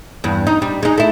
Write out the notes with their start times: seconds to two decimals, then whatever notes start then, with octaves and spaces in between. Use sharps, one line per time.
0.24 E2 G2
0.47 D#4
0.62 G3
0.83 G#3 D#4
0.98 A3 E4